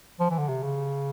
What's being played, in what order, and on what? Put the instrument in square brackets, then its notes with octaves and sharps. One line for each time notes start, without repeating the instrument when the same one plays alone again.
[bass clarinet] F3
E3
D3
C3
C#3